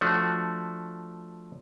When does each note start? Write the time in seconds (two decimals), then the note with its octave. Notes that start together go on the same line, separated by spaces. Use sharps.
0.01 F3 A3 D4 F#4